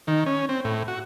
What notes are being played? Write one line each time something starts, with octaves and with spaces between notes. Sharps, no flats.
D#3
C#4
C4
A2
F#4